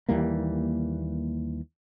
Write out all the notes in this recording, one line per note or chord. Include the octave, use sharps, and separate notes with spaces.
D#2 E3 G3 A#3